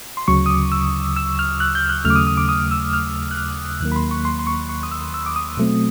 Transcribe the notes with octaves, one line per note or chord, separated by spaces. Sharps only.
C6
D2 C#3 F#3 C#6
D#6
D6
E6
E6
F6
F#6
G6
F#6
D#2 C#3 F#3 A3 F6
D6
D#6
D#6
D6
D#6
E6
F6
F#6
F6
D#2 D#3 F#3 A#3 F#6
B5
C6
C#6
C6
C6
C#6
C#6
D#6
E6
E6
D6
D#6
B2 F#3 A3 C4